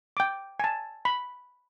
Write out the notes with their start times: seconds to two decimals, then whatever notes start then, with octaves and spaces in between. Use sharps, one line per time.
0.17 G5 D6
0.60 G#5 A5
1.05 B5